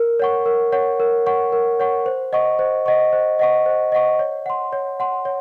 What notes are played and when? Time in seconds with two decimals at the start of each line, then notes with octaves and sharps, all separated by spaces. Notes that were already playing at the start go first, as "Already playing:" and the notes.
Already playing: A#4
0.20 C#5 F#5 C#6
0.46 A#4
0.73 C#5 F#5 C#6
1.00 A#4
1.26 C#5 F#5 C#6
1.53 A#4
1.80 C#5 F#5 C#6
2.06 C5
2.33 D#5 F#5 C#6
2.59 C5
2.86 D#5 F#5 C#6
3.13 C5
3.39 D#5 F#5 C#6
3.66 C5
3.92 D#5 F#5 C#6
4.19 C#5
4.46 F#5 C6
4.73 C#5
5.00 F#5 C6
5.25 C#5